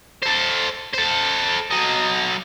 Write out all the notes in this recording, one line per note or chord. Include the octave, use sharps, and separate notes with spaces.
A4 C5
A4 C5
F#3 D#5